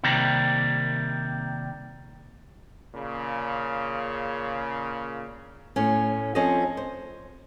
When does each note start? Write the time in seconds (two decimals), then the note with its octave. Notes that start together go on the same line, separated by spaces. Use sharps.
0.03 C3 D#3 G3 A#3
2.93 A#2 C#3
5.76 A2 C#4
6.35 F3 C4 C#4 A4 C#5 D#5
6.77 C5